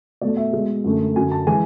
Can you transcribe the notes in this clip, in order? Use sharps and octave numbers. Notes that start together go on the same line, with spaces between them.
B2 A3 D5
E5
B2 G#3
F#2 D3 A3
F#2 D3 F#3 G#5
A5
E3 G#3 G#5